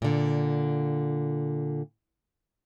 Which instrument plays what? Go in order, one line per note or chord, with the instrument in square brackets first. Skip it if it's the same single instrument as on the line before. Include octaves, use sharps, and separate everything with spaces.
[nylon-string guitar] A#2 D3